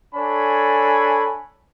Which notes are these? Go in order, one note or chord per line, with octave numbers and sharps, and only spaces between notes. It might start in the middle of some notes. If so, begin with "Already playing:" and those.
D4 A4 C#5 G#5 B5